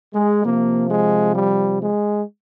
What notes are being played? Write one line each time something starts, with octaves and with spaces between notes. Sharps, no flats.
G#3
C3 F3 A#3
G#3
G3
G#3